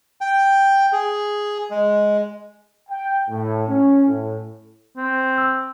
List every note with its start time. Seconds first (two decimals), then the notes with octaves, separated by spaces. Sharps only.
0.21 G5
0.93 G#4
1.71 G#3
2.90 G5
3.30 A2
3.68 C#4
4.07 A2
4.97 C4
5.38 E6